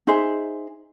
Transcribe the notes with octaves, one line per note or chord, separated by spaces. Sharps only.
D#4 G#4 C5 E5